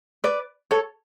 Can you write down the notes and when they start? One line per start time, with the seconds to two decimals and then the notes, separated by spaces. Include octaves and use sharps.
0.24 B4 D5
0.71 A4 C#5